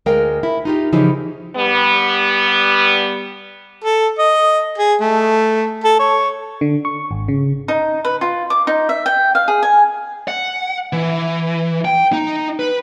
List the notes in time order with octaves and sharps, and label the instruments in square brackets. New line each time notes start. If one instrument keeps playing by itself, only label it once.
[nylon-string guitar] D2 G#3 A#4 F5 G5
E4
D#4 F4 G4
C#3 E3 F3 D#4 E4 G4
[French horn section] G3 B3
[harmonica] A4
D#5
G#4
A3
A4
C#5
[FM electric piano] D3
C#6
G#1
C#3
[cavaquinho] D#4
B4
F4
D6
D#4
E5
G5
F5
G#4
G#5
[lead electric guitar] F#5
E3
G5
D#4
B4